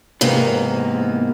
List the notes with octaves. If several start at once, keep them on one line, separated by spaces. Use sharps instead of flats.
G#2 C3 E3 A#3 B3